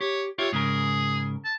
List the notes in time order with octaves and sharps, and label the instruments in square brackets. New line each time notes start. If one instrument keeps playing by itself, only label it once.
[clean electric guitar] G4 [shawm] C#5
[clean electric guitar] F4 G4 E5 [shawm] C#5
[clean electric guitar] G#2 C#3 A#4 [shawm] G#4
[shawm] A5